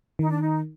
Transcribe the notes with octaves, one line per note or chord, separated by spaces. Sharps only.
D#3 D#4
D4
D#4